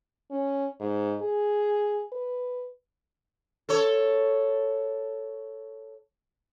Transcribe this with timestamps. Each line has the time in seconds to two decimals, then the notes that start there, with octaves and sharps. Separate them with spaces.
0.31 C#4
0.80 G#2
1.21 G#4
2.12 B4
3.69 A4 C#5